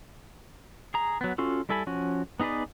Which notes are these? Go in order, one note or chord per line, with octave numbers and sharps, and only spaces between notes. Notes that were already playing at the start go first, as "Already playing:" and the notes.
G#4 A#5
F#3 B3
C#4 F4 F#4 A4
G3 E4 A4 G#5 B5
F3 C#4 F#4
B3 D#4 G#4 B4 D5